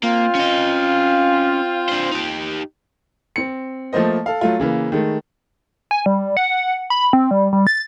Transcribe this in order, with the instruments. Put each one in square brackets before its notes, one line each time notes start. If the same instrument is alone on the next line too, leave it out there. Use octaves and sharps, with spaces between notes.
[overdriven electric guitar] A#3 [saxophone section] C4 F4
[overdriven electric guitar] C#4 D#5
D4 C5
D#4 G4
[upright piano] C4 C#7
F3 A3 A#3 C5 D#5
A4 F5
F#3 A3 F4
C#3 E3 A#3
D#3 G#3 A3
[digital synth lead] G#5
G3
F#5
B5
C4
G3
G3
A6